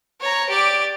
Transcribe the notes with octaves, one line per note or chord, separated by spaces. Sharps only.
C#5 A#5
G4 D5